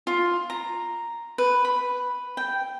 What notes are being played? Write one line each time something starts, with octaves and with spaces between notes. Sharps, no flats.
F4
A#5
B4
B5
G5